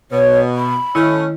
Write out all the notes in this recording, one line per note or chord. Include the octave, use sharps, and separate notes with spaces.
B2 C#5
B5
D#3 A3 C#4 E4